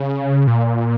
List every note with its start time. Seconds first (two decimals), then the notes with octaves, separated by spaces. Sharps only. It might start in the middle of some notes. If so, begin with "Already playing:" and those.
Already playing: C#3
0.47 A#2